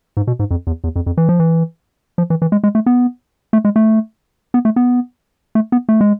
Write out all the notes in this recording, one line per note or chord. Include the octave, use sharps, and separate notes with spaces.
G#2
B2
G#2
F2
E2
E2
F2
F2
E3
F3
E3
F3
E3
E3
G#3
G#3
A3
B3
A3
G#3
A3
B3
A3
B3
A3
B3
A3
G#3